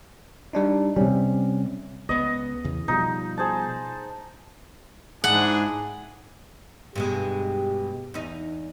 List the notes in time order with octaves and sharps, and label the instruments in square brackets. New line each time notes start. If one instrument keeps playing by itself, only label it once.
[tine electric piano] G3 D4 D#4
[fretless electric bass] C3 G3 [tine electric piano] C#4
[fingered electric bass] C#2 B3 [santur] D#5
[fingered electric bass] E2 C#3
[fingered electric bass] B2 F3 G3 [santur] D#4
[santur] G#4 C5 A5
[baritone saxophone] G#2 [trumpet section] D4 E4 G#4 [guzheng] F#5
[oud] G2 B2 G#3 [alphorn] G4
[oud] E2 D#4